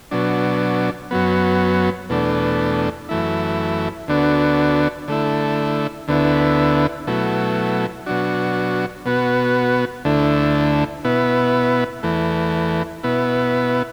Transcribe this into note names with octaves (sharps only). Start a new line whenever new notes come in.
B2 F#3 D4
F#2 F#3 B3
E2 B2 A3 D4
F#2 E3 A3 E4
D2 D3 B3 D4 F#4
D3 A3 E4
D2 D3 B3 E4
B2 F#3 A3 E4
B2 F#3 D4 F#4
B2 B3 F#4
D2 D3 A3 E4
B2 B3 E4
E2 E3 A3
B2 B3 E4